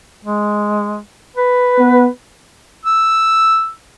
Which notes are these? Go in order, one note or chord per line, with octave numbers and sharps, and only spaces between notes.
G#3
B4
B3
E6